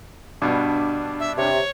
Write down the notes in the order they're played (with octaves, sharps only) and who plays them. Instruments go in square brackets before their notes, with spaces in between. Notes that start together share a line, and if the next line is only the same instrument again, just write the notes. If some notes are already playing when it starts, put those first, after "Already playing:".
[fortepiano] G2 B2 [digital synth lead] D4
[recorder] E5
[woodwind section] C3 [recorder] C#5